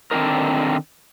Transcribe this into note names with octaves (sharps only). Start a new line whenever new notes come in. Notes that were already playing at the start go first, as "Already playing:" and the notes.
D3 D#3 C4 D4 D#4 A#4